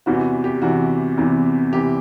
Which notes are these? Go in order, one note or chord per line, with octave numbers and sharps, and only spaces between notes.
E2 C3 E3 F#4
G4
E2 C3 E3 F#4
E2 C3 E3
C3 E3 G4